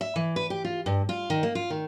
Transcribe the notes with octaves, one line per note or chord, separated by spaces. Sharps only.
E5
E3
B4
G4
F4
G2
F4
D#3
A#3
F4
D#3